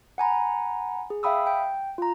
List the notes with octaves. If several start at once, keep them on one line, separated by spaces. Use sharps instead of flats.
F#5 G#5 A#5 B5
G#4
E5 F5 G5 B5 D#6 E6
G5
F4 A#5